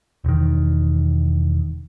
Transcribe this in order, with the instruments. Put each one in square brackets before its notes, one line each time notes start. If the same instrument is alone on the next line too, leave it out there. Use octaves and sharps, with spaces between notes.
[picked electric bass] E1 D#3